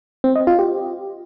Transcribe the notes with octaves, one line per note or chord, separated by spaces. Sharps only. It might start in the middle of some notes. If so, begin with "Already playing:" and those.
C4
D#5
F4
G4